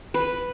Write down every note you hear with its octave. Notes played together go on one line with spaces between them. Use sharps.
B4